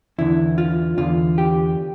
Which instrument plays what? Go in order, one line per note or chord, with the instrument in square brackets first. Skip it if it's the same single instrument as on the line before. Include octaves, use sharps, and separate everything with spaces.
[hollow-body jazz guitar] E2 D3 E4
F4
E2 D3 F4
G4